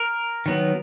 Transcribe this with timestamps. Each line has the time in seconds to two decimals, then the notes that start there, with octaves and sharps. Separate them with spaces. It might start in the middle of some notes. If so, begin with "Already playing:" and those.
Already playing: A#4
0.46 D#3 F#3 B3